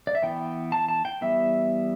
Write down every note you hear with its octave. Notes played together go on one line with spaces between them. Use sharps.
D5
E5
E3 B3 G5
A5
A5
G5
E3 G3 B3 E5